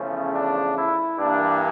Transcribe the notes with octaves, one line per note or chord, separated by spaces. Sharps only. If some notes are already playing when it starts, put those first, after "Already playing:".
Already playing: E2 C#3 F3 A3 C#4
D4
E4
G2 E3 A#3 D4